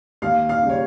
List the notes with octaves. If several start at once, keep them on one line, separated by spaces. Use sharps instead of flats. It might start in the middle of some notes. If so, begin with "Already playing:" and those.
D#2 F5
F5
C#3 G3
C#5